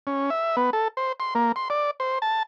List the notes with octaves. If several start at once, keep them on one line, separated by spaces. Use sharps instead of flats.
C#4
E5
B3
A4
C5
C6
A#3
C6
D5
C5
A5